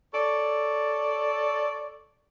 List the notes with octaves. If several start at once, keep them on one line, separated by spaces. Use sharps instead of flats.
A4 C#5 D5